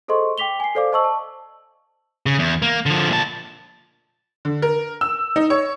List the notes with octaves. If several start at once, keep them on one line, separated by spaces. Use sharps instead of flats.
G#4 A4 C5 D#5 C6 C#6
G5 D6 B6 F7 G7
G#5 C7
A4 C5 D5 F5 D6
C5 D#5 A5 C#6 E6 F#7
A5
C#3
E2
A#3
D3 F3
A#2 A5
D3
A#4
E6
D#4
C#5